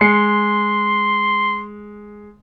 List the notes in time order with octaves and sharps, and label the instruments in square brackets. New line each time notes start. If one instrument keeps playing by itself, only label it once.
[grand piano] G#3 C7 C#7 [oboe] C6